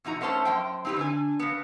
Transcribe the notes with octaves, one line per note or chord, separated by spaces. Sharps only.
E2 B2 D#4 F#4 A#5
A3 B3 C#4 C5 A5
F#2 C5 G5
C4 D#4 F#4 G4 B4
D3 D4 G#5
C#3 B3